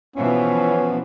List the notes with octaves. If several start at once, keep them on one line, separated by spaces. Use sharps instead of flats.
B2 E3 F3 B3 C#4